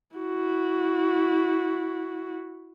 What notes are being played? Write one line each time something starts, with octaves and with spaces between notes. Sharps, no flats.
E4 F#4